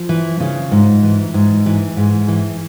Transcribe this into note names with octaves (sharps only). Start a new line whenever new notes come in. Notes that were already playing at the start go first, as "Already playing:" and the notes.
Already playing: F3
E3
C#3
G#2
E3
G#2
E3
G#2
E3